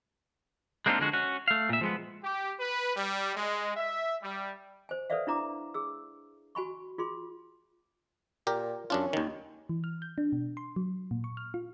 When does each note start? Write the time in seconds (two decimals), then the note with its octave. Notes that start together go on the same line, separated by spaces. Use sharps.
0.86 G#3 A#3 C4 D4 D#4 F4
0.99 D3 F3 G#3 F#4
1.13 C#4 F#4
1.48 A3 F5
1.69 A#2 E5
1.81 F3 G#3 B3
2.23 G4
2.58 B4
2.95 G3
3.34 G#3
3.77 E5
4.22 G3
4.89 C5 G#5
5.10 A4 B4 C5 D5 E5 F5
5.27 D4 E4 A#5 D6
5.74 G#4 E6
6.55 F#4 G#5 B5 C#6
6.98 F4 G#4 C6
8.47 A#2 G4 A#4
8.90 F#2 C#4 D4 F4
9.13 D#2 D#3
9.69 E3
9.84 F6
10.02 G6
10.18 D4
10.33 B2
10.57 C6
10.76 F#3
11.11 A#2
11.24 C#6
11.37 F6
11.54 F4